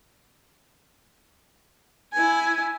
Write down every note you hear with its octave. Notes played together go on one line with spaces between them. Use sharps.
E4 G#5